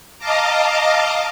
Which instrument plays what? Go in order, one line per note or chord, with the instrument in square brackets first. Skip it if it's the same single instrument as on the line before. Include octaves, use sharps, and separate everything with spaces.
[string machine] D#5 F5 A5 A#5 D6